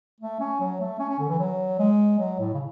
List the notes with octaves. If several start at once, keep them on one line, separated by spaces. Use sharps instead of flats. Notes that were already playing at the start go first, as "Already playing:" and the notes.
A3
C#4
F#3
A3
C#4
C#4
D3
E3
F#3
G#3
F#3
A2
C#3